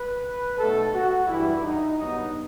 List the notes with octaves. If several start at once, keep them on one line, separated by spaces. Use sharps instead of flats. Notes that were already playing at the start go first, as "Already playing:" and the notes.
Already playing: B4
B1 B2 A3 A4
F#4
G2 E3 G3 E4
D#4
G2 F#3 B3 D#4